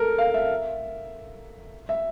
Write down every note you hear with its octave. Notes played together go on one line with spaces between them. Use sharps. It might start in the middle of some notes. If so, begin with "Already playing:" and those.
Already playing: A4 A#4
F5
E5
E5